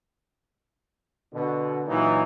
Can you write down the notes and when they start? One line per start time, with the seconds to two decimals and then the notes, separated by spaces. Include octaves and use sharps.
1.34 B2 D3
1.87 A#2 E3 F#3 D#4